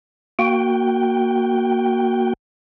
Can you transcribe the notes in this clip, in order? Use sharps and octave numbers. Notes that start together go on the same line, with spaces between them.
A#3 F#4 G5